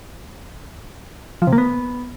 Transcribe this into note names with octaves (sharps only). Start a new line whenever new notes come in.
F3
C3
A#3
B3